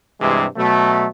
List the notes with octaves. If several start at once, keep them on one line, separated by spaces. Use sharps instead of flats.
G2 C3 E3 G#3
B2 F#3 A3